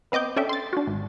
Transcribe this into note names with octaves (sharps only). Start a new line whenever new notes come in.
B3 C4 D#5 D6 G6
C#4 D4 A4 E5 G5
C6 A6
D4 F#4
G#1